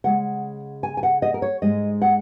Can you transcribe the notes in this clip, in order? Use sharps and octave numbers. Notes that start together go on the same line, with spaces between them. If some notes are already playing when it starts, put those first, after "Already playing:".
C#3 G#3 F#5
G#5
G#5
F#5
D#5
A#4
C#5
G#2 G#3 D#5
F#5